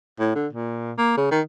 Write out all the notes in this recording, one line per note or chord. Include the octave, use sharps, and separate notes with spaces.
A2
D3
A#2
A#3
C#3
D#3